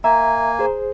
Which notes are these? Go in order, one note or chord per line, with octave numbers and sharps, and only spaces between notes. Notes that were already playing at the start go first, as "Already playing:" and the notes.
A#3 E5 G#5 A#5
G#4 C5